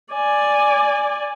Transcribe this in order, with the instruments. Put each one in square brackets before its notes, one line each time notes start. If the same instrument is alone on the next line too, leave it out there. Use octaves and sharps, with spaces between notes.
[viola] D5 G#5